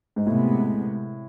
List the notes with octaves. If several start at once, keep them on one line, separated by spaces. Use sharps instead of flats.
G#2
A2 C3 G#3 B3